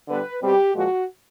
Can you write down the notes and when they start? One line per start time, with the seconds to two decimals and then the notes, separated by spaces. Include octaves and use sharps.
0.08 D3 G3 B3 B4
0.41 B2 G3 C4 G4
0.74 A#2 F3 G#3 F#4